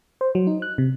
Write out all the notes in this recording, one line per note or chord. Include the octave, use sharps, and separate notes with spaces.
C5
F#3
D#4
F#6
C3